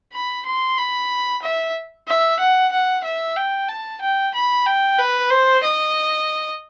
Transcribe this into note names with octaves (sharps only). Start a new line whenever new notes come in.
B5
C6
B5
E5
E5
F#5
F#5
E5
G5
A5
G5
B5
G5
B4
C5
D#5